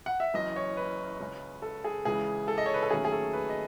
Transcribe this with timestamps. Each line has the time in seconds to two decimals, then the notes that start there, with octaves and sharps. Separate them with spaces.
0.06 F#5
0.20 E5
0.34 F#1 F#2 E3 D#5
0.56 C#5
0.77 B4
1.19 C#2 C#3 G#3 C#4
1.62 A4
1.84 G#4
2.05 C#2 C#3 E3 G#4
2.48 A4
2.58 D#5
2.66 C#5
2.74 B4
2.83 A4
2.90 D#2 D#3 F#3 A3 C#4 G#4
3.05 G#4
3.12 A4
3.33 B4
3.49 D#5